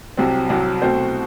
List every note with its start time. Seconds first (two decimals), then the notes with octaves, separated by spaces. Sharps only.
0.17 C2 C3 F#3 C4
0.49 C2 C3 F#3 C4
0.82 B2 A3 C4 F#4 C5